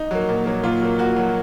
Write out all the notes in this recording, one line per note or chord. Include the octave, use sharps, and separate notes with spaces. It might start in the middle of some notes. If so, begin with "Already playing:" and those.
Already playing: D#4
F#3 A#3
A#2
F#3 A#3
A#2 F4
F#3 A#3
A#2 F#4
F#3 A#3